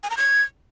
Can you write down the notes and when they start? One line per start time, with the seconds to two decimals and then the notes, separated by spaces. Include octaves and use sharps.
0.03 G#5
0.10 A#5
0.17 G#6